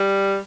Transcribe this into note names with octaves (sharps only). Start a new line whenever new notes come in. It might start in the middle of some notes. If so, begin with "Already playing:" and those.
Already playing: G3